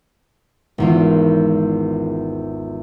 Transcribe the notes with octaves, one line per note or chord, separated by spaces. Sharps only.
G#1 E2 F4